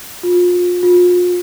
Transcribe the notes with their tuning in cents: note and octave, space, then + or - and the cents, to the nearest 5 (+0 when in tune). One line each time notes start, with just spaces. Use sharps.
F4 +30
F4 +35